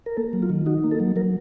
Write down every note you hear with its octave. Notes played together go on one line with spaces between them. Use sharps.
A#4
A#3 A4
F#3
F4
D#3
D#4 F#4
A#3
A4
F#3
F#3 A#4